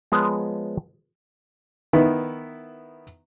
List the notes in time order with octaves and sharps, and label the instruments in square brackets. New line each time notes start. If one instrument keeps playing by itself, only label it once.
[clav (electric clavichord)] F3 G#3 B3 C#5 A#5
[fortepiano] D#3 B3 E4